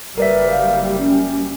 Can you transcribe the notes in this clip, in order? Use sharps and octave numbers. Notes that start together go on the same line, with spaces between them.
F#1 G3 A#4 B4 D5 E5
F5
C#4